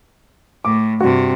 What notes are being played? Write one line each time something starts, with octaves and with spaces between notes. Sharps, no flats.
A2 D6
G2 C3 F#4